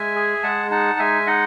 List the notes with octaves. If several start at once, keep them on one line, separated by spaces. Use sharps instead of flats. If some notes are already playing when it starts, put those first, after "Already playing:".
Already playing: G#3 E5 G#5
G#4
G#3 F#5 A5
D#4 F#5 A5
G#3 E5 G#5
D#4 D#5 F#5